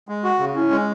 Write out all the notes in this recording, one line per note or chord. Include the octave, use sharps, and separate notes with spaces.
G#3
F#4
C#3
C#4 E4
G#3